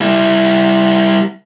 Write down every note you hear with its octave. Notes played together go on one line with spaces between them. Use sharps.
G3 E4